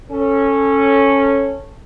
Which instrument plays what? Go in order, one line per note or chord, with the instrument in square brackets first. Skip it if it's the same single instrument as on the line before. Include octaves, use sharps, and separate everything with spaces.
[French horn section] C#4 A4